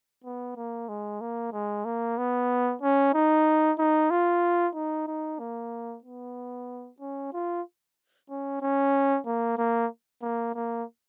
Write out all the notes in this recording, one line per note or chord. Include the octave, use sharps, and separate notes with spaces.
B3
A#3
G#3
A#3
G#3
A#3
B3
C#4
D#4
D#4
F4
D#4
D#4
A#3
B3
C#4
F4
C#4
C#4
A#3
A#3
A#3
A#3